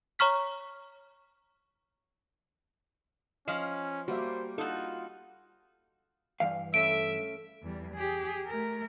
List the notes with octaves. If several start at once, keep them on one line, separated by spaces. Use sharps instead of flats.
C#5 A#5 C#6 F6 B6
F3 C#4 D#5 F5
G3 A#3 F#4 C5 E5
D#4 F4 F#4 A4
G2 E3 F5
A3 C#4 E5 B5 D7
E2 G3
G4 G#4
A3 A#4